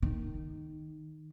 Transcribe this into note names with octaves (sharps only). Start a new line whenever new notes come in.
D#3